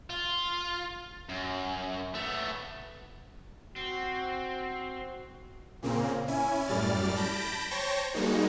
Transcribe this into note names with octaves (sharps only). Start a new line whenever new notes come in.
F4
F#2
A3 B3
C4 F#4
A#2 C#3 A#3 C4
C#4 E4 G#5
F#2 A2 G3 D5 F6 A6
A5 B5 G6 A#6 D7
C5 C#5 G5 A5 C#6 A#6
G3 G#3 A#3 D#4 F#4